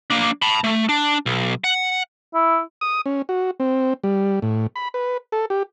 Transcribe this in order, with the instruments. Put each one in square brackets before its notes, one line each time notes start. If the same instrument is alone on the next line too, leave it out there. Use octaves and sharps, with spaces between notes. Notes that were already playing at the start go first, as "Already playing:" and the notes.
[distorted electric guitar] A#3 D4
A5 B5
A3
D4
B1
F#5
[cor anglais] E4
[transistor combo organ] D#6
C#4
F#4
C4
G3
A2
B5
B4
A4
G4